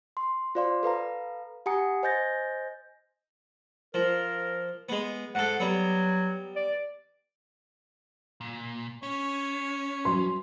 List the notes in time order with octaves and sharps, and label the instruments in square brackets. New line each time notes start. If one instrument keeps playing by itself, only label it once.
[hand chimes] C6
F4 C5 D5 F5 C6
A4 B4 F5 A#5
G4 F#5 G#5 A#5 D#6 C#7
C5 D#5 G#5 G6 A6 A#6
[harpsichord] F3 [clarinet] A#4
[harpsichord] G#3 B3
[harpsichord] G#2 A4 [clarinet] F#5
[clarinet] F#3 [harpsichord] G3 B3
[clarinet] D5
[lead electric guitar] A#2
[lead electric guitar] C#4 [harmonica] C#5
[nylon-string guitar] E3 F#3 [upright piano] C6